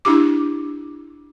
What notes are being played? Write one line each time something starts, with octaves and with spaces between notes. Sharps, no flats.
D4 E4 G4 D6